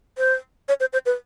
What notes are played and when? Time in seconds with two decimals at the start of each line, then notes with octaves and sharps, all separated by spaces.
0.18 C5
0.68 C#5
0.80 C5
0.93 C5
1.06 B4